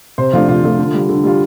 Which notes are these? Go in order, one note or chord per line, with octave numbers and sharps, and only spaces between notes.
C3 C5
F3 A3 D4 F4
C3 F4
F3 A3 D4
D3
G3 F4
D3
G3 F4